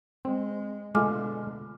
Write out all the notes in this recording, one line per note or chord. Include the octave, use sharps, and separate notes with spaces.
G#3 C4
B2 D3 G#3 A3 F4 G#5 D6 F6